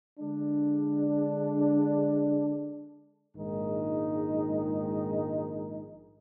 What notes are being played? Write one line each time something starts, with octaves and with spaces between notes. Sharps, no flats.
D3 G#3 D4
A#1 G#2 D#3 G#3 D#4